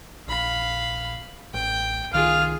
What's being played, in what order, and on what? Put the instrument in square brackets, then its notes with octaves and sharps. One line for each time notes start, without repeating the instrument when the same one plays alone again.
[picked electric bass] A#1 [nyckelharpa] F5 B5
[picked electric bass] A1 [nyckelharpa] G5
[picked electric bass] C2 D#3 [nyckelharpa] F4 G#4 [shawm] F5